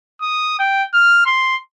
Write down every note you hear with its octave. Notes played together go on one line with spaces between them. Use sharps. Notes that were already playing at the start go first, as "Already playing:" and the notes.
D#6
G5
F6
C6